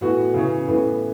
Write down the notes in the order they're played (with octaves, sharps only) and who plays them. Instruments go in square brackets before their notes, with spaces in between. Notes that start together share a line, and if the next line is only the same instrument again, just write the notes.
[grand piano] A2 E3 B3 F#4
C#3 E3 C#4
A2 E3 B3